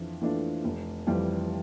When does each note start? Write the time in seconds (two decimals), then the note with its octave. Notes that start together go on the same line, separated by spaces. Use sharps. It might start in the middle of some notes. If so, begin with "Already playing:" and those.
Already playing: F2 E3 D4 F4
0.22 E3 A3 D4 F4
0.64 F1
1.07 F2 E3 G3